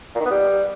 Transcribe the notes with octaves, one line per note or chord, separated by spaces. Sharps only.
A#2
D#3
B3
G3